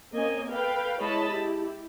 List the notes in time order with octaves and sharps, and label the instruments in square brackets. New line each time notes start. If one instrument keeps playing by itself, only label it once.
[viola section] A#3 C4 C#4 D#5 G#5
A4 B4 F5 G5
G#3 E4 C#5 D#5 A5 B5
E4 G4